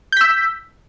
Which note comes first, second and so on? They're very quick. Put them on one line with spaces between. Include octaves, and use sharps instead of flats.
G6 B6 E6